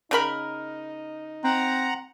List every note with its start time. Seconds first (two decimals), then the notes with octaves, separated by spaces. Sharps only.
0.11 C#3 D#4 A#4 B5
1.44 C4 F#5 A#5